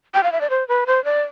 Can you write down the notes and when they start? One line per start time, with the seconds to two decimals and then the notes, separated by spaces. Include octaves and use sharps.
0.14 G5
0.23 F5
0.32 E5
0.41 D5
0.50 C5
0.68 B4
0.87 C5
1.05 D5